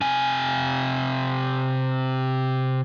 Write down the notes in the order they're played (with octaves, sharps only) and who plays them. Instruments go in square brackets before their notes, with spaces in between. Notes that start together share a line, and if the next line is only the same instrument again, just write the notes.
[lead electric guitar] C3 G#5